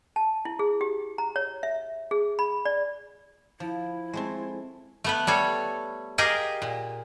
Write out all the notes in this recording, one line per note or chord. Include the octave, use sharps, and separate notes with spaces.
A5
E4
G#4
G4
A#5
C#5
E5
G#4
B5
D5
F3 E4
G#3 A3 C4
A3 B3 B4
G3 A4 C#5
G4 G#4 A#4 D#5 F5 G5
A#2